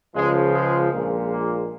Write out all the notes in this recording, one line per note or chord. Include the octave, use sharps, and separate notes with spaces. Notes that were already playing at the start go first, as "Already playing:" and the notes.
C#2 C#3 F3 G#3
G#3
A#1 A#2 G#3
A#3